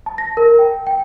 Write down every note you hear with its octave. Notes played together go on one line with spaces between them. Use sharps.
A5
A#6
A#4
G5
G5